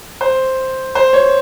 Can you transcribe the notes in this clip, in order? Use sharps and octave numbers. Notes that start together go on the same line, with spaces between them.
C5
C5
C#5